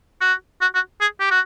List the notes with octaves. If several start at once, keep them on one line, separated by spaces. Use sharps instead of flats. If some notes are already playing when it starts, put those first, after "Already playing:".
F#4
F#4
F#4
G#4
G4
F#4